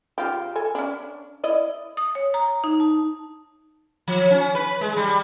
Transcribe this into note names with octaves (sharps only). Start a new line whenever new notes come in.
C#3 F4 G4
A4 G#5
C#4 D4
E4 D5 D#5
D#6
C#5
A#5
D#4
A5
F3
C#4
B4
G#3
G3